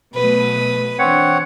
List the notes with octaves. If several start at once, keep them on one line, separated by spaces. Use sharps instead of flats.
B2 F#3 A3 B4 D#6
E3 C4 D4 C#5 F#5